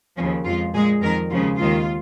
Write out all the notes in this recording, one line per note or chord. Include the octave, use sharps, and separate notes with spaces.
D#2 C#3 F3 C#4
F2 F3 G#3 F4
A#2 G#3 G#4
F2 D#3 G#3 A#4
D#2 C#3 F3 G#3 F4
D#2 D#3 G#3 F4